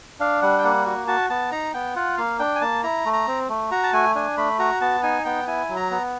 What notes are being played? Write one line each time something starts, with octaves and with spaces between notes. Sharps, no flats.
D4 F5
G3 F#5
G5
A#3 F#5
F#4
F#4 A5
B3 A5
D#4 A#5
B3 G5
F4 F#5
A#3 F5
D4 G5
G#5
A#3 A5
E4 A#5
A3
A#5
C4
A3
F#4 A#5
A5
A3 G#5
D4 G#5
A3 B5
F#4 A#5
B3 A5
D#4 G#5
B3 G5
E4 G#5
F#3
A#5
B3